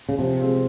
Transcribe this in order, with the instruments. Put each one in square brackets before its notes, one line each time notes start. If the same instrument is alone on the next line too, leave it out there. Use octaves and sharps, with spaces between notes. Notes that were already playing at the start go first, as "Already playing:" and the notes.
[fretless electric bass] C#3
[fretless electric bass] C3 [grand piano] F3
[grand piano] G#3 C4 F4